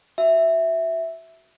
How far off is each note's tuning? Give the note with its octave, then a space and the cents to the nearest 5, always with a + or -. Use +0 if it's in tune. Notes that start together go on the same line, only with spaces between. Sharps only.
F#4 +5 E5 +0